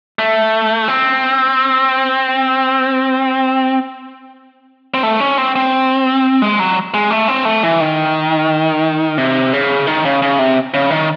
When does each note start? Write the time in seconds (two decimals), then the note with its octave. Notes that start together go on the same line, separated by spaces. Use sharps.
0.19 A3
0.88 C4
4.94 C4
5.03 A3
5.20 C#4
5.38 C4
5.56 C4
6.42 G#3
6.60 F#3
6.94 G#3
7.11 A3
7.28 C4
7.45 A3
7.63 E3
7.80 D#3
9.18 C3
9.53 C#3
9.87 D#3
10.05 C#3
10.22 C#3
10.39 C3
10.74 C#3
10.90 D#3